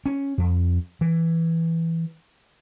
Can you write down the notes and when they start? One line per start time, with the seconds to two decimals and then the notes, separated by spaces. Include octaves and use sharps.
0.06 C#4
0.38 F2
1.01 E3